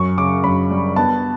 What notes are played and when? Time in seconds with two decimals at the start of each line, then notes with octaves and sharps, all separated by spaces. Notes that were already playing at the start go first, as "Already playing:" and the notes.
Already playing: F#2 C#6
0.18 C#3 D6
0.44 F#2 B5
0.71 G3
0.96 B3 A5